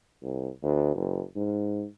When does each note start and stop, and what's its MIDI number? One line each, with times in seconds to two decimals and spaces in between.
0.23 0.48 36
0.63 0.94 38
0.96 1.22 30
1.36 1.84 44